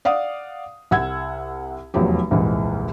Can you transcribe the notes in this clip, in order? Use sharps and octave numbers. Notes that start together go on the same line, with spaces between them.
D5 F5 F#5 D#6
C2 F#5 E6 G#6
F1 E2 F3 F#3 G4
D#1 C2 F2 G#2 E3